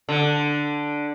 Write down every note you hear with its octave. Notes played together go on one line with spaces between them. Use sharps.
D3